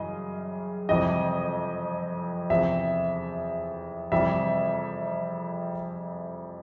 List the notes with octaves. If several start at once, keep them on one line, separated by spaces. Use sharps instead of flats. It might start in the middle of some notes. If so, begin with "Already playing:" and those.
Already playing: F#2 C#3 E3 G3 D#5
F2 C3 E3 G3 D#5
E2 C3 F3 E5
F2 C3 E3 G3 E5